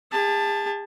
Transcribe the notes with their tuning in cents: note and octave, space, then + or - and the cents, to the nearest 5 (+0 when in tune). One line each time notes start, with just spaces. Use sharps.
G#4 -40 A5 +0